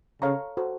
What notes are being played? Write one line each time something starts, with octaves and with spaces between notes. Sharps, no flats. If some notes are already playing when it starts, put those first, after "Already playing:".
C#3 A4 C#5 F5 A#5 C#6
F#4 A4 C5